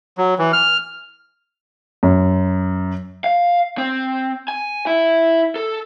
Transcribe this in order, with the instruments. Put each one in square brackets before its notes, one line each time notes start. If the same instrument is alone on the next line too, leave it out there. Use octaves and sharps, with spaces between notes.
[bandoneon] F#3
E3
F6
[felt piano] F#2
[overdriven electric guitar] F5
C4
G#5
E4
A4